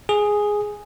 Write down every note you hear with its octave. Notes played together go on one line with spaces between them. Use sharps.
G#4